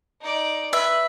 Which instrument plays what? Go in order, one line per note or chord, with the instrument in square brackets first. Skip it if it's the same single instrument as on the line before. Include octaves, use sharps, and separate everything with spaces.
[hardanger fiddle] D#4 D5
[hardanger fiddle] B4 [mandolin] E5